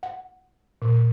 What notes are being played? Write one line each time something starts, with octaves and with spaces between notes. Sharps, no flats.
F#5
A#2